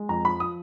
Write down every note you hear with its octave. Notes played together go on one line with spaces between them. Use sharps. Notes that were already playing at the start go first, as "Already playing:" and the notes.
Already playing: G#3
F2 A#5
F3 B5
D#6